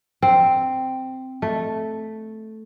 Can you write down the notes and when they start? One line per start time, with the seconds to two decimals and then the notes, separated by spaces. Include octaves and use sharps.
0.23 C4
1.42 A3